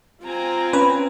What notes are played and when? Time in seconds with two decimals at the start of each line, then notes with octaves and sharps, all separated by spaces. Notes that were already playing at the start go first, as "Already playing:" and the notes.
0.24 C4 F4 G#5 A#5
0.73 C#4 B4